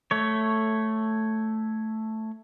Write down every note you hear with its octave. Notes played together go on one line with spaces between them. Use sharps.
A3 C#5